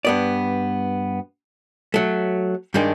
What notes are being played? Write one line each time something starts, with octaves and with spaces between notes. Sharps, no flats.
G2 B3 D5
F#3 A3
G2 D#3 G#3 D4